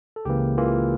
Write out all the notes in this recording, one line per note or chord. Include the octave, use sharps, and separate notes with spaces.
A4
C#2 C#3 E3 A#3 G4
C#2 C#3 E3 A#3 F4